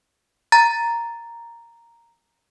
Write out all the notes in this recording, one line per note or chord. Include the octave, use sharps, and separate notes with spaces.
A#5 A6